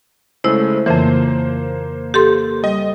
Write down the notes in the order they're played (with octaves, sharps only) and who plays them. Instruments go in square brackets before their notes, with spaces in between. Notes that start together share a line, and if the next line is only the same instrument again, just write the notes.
[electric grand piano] C#3 G#3 A3 [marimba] E4 C5
[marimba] F2 C#3 E3 [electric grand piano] A#3 C5
[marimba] G4 A4 C6
[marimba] G3 [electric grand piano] D#5